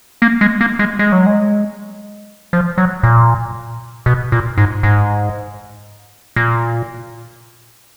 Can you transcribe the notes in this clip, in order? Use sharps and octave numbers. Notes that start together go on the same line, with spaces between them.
A#3
G#3
A#3
G#3
G#3
F#3
G#3
F3
F#3
A#2
B2
A#2
G#2
G#2
A#2